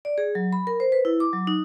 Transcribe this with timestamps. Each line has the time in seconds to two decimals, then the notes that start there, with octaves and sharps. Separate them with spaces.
0.05 D5
0.18 G#4
0.35 F#3
0.53 B5
0.67 A#4
0.80 C5
0.92 B4
1.05 E4
1.20 D6
1.33 F#3
1.47 D#4